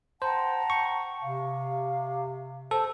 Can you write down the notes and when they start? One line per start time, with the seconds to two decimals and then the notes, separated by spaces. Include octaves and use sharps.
0.22 C5 F#5 G5 A5 A#5
0.70 C#6
1.22 C3 F5
2.71 A4 C5